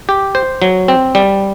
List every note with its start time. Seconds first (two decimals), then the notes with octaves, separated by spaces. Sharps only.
0.09 G4
0.35 C5
0.62 F#3
0.88 C4
1.15 G3